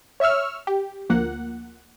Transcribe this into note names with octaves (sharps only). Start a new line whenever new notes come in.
C#5 E5 C#6 E6 F6
G4
D2 F3 A#3 F#5